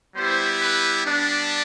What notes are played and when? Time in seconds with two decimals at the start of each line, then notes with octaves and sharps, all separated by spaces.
0.16 G3 B3 E4 G4 C5
0.61 B4
1.05 G3 B3 D4